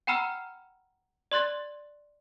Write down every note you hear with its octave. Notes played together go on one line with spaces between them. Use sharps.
F#5 G5 A#5 B5 E6 F6
D5 C6 F#6 A6